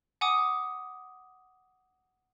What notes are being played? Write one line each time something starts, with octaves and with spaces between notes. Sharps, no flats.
F#5 G#5 D6 D#6